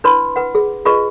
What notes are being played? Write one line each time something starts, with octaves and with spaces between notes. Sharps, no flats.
D4 E4 B4 B5 C6
B4 F#5
G#4
F4 G#4 B4 D#5 C#6